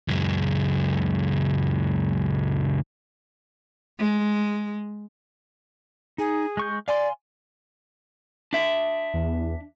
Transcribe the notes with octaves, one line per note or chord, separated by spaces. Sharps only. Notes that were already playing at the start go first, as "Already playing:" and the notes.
C#2 F#2
G#3
D#4 G#4
G#3 C#6 G6
D5 F5 G#5 C6
D4 E5
E2